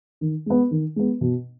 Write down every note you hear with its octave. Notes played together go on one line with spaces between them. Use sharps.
D#3
G#3 B3
D#3
G#3 B3
B2